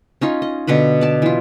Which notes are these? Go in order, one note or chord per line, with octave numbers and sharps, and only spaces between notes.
C#4 D#4 F4
D#5
B2 D3 B4 B5
D5 A5
E3 F4